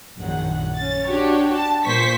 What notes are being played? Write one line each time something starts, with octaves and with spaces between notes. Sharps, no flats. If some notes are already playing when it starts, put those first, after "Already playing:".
A#1 F#2 D#3 F#5
C#4 A6
D4 F#4 G4 C#5
A5
A#2 C5 C#6 B6